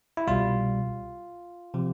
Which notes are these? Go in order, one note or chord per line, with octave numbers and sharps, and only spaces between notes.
E4
C2 B2 G3 F4
C3 F3